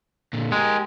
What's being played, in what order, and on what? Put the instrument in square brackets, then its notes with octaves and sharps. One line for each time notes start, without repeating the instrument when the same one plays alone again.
[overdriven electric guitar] A#2 D3
[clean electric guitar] G#3 [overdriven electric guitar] G4 A#4